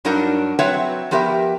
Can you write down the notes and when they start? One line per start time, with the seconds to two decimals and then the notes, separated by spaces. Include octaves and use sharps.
0.05 G2 F#3 D4 D#4 A#4 F#5
0.59 F#3 C4 B4 C#5 E5 F#5
1.11 F3 B3 G4 A#4 E5